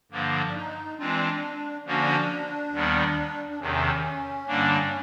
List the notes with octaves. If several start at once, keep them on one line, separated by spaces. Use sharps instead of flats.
G2 D3 F3 A#3
D4
D#4
E3 G#3 C4 D4 F4
D3 F3 A#3 C#4 D4 F#4
D#2 D#3 G3 B3
D4
E2 C3 D#3 C#4
G2 D3 G3 A#3 D4